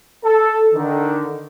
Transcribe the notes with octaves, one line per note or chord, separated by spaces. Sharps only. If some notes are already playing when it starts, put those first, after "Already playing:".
A4
D3 D#3